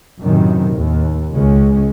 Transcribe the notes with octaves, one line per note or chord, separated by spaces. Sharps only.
F#2 A2 C3 D#3
D#2
C#2 G#3 C#4